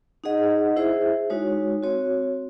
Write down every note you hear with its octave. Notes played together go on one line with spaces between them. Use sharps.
D#4 G#4 D#5 F#5
E4 G#4 C5 E5
G#3 D#4 F#4 C#5
C4 F#4 C#5